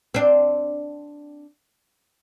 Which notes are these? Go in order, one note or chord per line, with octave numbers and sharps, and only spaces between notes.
C4 D4